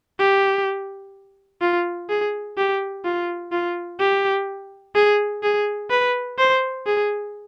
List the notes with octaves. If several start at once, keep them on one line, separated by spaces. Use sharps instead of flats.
G4
F4
G#4
G4
F4
F4
G4
G#4
G#4
B4
C5
G#4